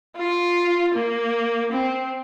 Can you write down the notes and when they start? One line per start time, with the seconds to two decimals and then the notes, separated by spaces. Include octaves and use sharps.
0.17 F4
0.95 A#3
1.72 C4